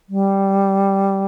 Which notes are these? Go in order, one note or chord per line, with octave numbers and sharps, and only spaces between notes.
G3